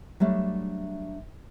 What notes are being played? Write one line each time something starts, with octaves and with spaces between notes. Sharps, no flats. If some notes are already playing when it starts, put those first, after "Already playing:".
F#3 G3 A3 D4